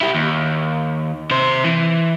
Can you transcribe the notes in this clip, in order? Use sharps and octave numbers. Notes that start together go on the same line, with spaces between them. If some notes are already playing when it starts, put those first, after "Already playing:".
E4 G4
D#2
C3 C5
E3